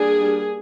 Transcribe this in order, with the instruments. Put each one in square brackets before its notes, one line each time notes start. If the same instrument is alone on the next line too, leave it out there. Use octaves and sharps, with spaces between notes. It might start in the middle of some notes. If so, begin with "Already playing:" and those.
Already playing: [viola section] G3 A#3 D4 G#4